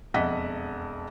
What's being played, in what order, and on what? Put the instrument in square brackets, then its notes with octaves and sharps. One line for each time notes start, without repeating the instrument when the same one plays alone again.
[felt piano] E1 F2 D#5 E5 F#5 B6